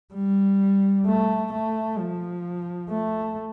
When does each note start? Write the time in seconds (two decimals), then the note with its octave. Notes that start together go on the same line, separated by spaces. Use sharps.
0.14 G3
1.06 A3
1.53 A3
1.98 F3
2.90 A3